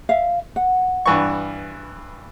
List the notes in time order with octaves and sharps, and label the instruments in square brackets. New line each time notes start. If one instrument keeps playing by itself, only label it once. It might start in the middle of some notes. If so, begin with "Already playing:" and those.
[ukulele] E5 F5
F#5
[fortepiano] G2 E3 C#6